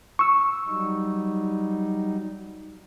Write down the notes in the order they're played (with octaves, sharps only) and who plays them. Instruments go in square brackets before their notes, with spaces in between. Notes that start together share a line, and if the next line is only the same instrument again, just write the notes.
[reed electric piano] C#6 E6
[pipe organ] F#3 G3 D#4